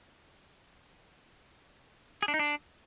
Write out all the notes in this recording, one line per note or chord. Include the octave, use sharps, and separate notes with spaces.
G#4
D4
D#4
D4